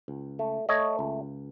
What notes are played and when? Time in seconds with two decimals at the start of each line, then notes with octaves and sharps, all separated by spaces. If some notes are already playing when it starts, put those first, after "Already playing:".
0.08 C#2
0.39 A3
0.69 A3 C#5 D#5
0.99 C#2